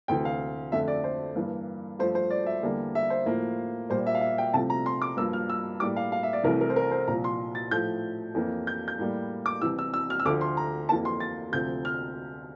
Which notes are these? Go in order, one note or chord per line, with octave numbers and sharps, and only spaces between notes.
D2 C3 E3 G5
F5
F2 D3 A3 E5
D5
C5
G2 E3 A#3
G2 F3 A3 C5
C5
D5
E5
E2 D3 G3 A#3
E5
C5
A2 F3 A#3
A#2 G3 A#3 C5
E5
F5
E5
G5
C2 C3 F3 A3 A5
A#5
C6
D6
G2 F3 A#3 E6
F6
E6
A2 G3 A#3 D6
F5
F5
E5
D5
C2 C3 E3 A3 A#4
A#4
C5
A#4
C5
C2 A#2 F3 A#5
C6
A6
A2 F3 A3 G6
F2 E3 A#3
G6
G6
A2 G3 A#3
D6
C2 C3 E3 E6
E6
E6
F6
E6
D2 D3 F3 A3 D6
C6
A#5
F2 E3 A#3 A5
C6
A6
D2 C3 F3 G6
F6